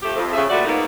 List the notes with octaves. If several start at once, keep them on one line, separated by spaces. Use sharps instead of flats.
F3 A3 G4
F2
C#3 F3 F4 G#4 E5
A#2 G3 A3 F#4 D5
G#2 A#3 B3 D#4